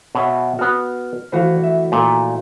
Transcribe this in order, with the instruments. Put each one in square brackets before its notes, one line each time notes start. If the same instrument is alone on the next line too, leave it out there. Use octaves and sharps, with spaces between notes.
[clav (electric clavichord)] B2 C#5 E5
[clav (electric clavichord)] B3 F#4 [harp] F6
[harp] E3 A3 F#4 [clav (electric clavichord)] C5 F5
[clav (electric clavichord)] E5
[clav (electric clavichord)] A#2 [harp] A3